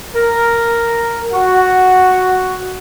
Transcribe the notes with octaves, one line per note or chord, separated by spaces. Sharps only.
A#4
F#4